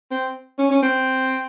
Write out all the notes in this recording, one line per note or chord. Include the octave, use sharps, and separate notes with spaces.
C4
C#4
C#4
C4